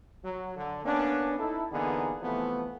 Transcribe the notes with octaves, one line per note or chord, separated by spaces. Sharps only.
F#3
D3
A#3 B3 C#4 D4
D#4 E4 A4
D3 E3 A#3 B3 D#4 G#4
C3 E3 F3 A3 B3